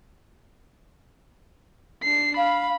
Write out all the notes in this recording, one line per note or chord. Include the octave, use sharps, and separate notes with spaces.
D4 C7
F5 B5